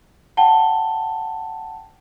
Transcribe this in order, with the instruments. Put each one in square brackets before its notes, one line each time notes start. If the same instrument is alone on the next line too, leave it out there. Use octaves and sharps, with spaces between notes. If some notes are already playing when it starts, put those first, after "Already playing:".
[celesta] F#5 G5 A5 G7